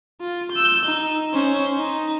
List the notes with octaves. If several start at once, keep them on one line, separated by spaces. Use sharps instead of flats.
F4
E6 G6
D#4
C#4 C5
D#4